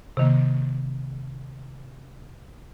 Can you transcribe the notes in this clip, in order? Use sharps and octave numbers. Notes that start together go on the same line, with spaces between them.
C3 D#3 A#3